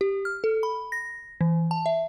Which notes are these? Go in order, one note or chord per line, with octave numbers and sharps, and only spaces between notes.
G4
F6
A4
B5
A#6
E3
A5
E5